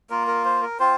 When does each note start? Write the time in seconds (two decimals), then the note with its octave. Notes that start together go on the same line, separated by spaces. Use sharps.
0.10 A#3 F4 A#4
0.27 A#4
0.45 C5
0.62 A#4
0.80 C4 F4 C5